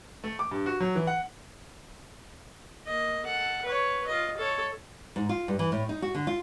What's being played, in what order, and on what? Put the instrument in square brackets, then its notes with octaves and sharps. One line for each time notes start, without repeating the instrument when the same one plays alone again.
[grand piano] A3
D6
G2
F#4
F#3
E3
F#5
[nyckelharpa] A#3 D#5
A4 F#5
B4 C#5
F4 D#5
A4 C#5
[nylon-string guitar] G#2
F4
G2
E3
A2
D#4
F#4
D3
F4